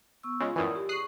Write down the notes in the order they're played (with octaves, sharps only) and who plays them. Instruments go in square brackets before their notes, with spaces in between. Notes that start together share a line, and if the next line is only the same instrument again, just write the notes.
[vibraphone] B3 C#6 E6
[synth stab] C#3 G#3 [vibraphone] F4
[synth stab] F#2 A2 E3 [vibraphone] A#4 D5 D#6
[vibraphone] G4
[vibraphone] G#4 C#6 [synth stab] D#6 F#6 C7